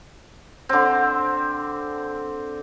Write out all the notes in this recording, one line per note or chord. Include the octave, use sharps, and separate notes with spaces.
D3 C4